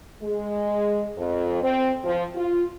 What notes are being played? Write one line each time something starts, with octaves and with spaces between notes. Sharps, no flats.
G#3
F2
C4
F3
F4